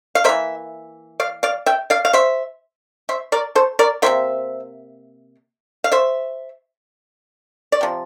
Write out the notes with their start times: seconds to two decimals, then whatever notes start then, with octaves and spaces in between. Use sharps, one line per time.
0.15 F5
0.24 E3 A#3 C5 E5
1.20 D5 F5
1.43 D5 F5
1.66 E5 G5
1.90 D5 F5
2.05 F5
2.13 C5 E5
3.09 C5 E5
3.32 A#4 D5
3.55 A4 C5
3.79 A#4 D5
4.02 C3 G3 A#3 C5 E5
5.84 F5
5.92 C5 E5
7.72 D5
7.81 C3 F3